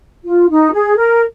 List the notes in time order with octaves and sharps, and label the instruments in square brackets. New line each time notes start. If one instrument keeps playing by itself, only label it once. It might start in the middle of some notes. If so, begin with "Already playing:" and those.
[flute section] F4
D#4
G#4
A#4